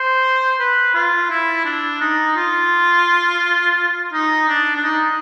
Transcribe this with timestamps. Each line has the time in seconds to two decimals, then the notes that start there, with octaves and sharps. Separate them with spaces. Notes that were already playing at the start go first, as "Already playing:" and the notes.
Already playing: C5
0.59 B4
0.94 F4
1.30 E4
1.65 D4
2.01 D#4
2.36 F4
4.13 D#4
4.48 D4
4.76 D4
4.84 D#4